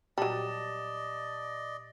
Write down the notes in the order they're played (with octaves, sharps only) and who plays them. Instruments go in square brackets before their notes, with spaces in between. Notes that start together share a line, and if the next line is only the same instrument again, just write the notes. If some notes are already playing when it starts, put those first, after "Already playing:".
[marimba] A#2 G4 [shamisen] F#3 G3 [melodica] D5 D#5 [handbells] A5